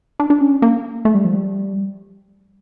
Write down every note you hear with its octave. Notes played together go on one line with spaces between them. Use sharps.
D4
D4
C#4
A#3
A3
G3
F3
G3